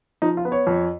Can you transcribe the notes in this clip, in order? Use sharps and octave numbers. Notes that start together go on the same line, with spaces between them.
F3 D#4
F4
B3
C#5
F2